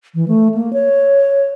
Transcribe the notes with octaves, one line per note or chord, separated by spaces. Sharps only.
E3
A3
A#3
C#5